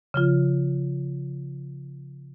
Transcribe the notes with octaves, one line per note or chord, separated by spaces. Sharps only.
C#3 F3 F4